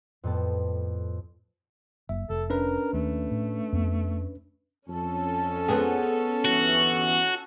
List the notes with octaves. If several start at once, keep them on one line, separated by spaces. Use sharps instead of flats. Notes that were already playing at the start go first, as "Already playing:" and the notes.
F2 A2 B3 A5
F#1 E5
F1 A4
C#4 D4 A#4 B4
D#2 A3
A2
F2 B3
F2 C#4 A4 A5
B3 C4 G#4
G1 E3 F#4